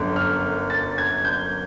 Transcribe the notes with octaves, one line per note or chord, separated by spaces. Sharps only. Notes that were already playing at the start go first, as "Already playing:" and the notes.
Already playing: G1 F#2 D3
F6
A6
G#6
G6